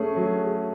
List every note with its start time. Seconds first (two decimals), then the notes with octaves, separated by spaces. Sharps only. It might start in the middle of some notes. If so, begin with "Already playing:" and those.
Already playing: A3 C#4 G#4
0.16 F#3
0.39 G#4